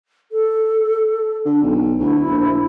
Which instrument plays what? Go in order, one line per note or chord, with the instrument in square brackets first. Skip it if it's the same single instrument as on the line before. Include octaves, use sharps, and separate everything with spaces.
[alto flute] A4
[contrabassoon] D3
B1
[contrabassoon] D2 [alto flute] E4
[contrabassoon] A#1